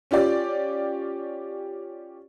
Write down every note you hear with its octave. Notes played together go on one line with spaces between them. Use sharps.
C#4 F4 G4 D5